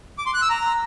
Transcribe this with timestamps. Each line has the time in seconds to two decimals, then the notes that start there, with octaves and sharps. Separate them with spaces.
0.18 D6
0.26 C6
0.34 F#6
0.42 E6
0.50 A#5